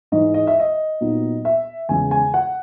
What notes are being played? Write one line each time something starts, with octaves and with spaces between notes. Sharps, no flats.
G#2 E3 G#3 D#4 D#5
D#5
E5
D#5
A#2 F#3 B3 D#4
E5
E2 C#3 G#3 G#5
G#5
F#5